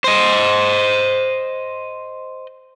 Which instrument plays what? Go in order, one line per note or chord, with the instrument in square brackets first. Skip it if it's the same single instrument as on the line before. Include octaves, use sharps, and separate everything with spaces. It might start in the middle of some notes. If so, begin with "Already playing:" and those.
[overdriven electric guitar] C5 D#5